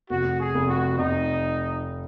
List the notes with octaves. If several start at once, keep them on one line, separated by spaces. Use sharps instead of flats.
F1 F#4
G#4
F1
F#4
F1 D#4